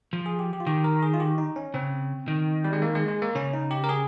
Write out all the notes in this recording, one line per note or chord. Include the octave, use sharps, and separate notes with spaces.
F3
G#4
G4
G4
F4
D#3 G4
A#4
G#4
F4
G4
D#4
C#4
C#3 C4
D#3
G3
G#3
A#3
G#3
G#3
A#3
C#3 C#4
D#4
G4
A#4
G#4